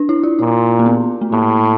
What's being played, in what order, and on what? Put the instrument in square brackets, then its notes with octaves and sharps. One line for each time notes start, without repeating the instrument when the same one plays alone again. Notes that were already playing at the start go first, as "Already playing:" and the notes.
Already playing: [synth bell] D4
E4
F4
[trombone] A#2 [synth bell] E4
[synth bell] A#3
B3
A3
[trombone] A2 [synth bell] A#3